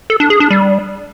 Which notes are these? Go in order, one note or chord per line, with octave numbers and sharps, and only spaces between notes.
A4
D4
G#4
D4
G3